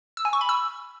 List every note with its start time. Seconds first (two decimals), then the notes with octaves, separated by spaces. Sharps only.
0.17 E6
0.25 G#5
0.33 C#6
0.41 B5
0.49 E6